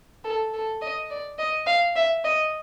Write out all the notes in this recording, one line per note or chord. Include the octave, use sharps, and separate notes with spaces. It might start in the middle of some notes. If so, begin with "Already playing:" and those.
A4
A4
D#5
D5
D#5
F5
E5
D#5